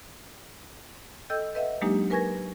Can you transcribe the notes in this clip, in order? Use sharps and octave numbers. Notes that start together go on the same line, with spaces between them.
A4 D#5 G5 E6 G6
B4 D#5 E5 F#5
F#3 G#3 A#3 D4 D#4 G4
A#4 B4 G#5 C#6 G#6 A#6